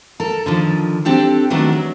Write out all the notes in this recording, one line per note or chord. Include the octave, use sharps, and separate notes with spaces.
A4 A#4
D3 D#3 F3
C4 D4 G4 A4
D#3 F#3 A3 B3 D4
F#3